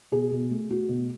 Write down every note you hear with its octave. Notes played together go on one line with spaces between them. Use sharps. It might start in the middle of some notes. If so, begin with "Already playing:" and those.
B2 G#4
B2
A3
A3 F#4
B2